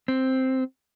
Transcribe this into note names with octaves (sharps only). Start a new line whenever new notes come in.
C4